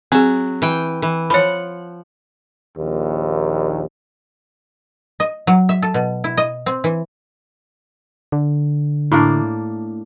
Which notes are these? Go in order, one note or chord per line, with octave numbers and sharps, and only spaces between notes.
F#3 C4 G#4
E3 G5
E3
F3 C#5 F#5 B5
A#1 D#2
D#5
F#3
E5
A4
B2
E4
D#5
C4
E3
D3
A2 A#3 D4